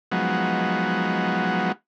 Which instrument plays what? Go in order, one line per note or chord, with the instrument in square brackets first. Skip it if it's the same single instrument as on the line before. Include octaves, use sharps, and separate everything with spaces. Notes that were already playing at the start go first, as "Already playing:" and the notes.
[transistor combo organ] F3 F#3 G#3 B3 D#4 F#4